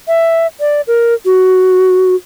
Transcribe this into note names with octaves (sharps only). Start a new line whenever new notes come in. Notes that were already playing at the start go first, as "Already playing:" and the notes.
E5
D5
A#4
F#4